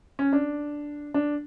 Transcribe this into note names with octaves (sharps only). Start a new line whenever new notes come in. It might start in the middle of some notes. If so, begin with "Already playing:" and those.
C#4
D4
D4